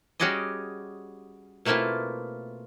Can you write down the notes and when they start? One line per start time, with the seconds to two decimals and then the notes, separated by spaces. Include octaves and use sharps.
0.20 G3 C#4 F#4 G#4 D5 D#5
1.65 B2 A3 A#3 C4 E4 F4